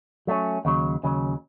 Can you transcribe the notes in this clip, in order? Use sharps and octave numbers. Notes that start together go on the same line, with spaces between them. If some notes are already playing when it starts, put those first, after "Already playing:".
F#3 A3 C#4
D#2 C#3 F#3
D#2 C#3 F#3